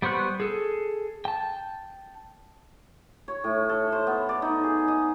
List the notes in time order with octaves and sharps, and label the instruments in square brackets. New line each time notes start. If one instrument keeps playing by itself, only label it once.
[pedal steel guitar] G3 B3 C5 C#6 F#6
G#4 A4
G5 A5
[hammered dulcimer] C#5
A2
A4
C5
B3
D5
D#4
G#4
D#5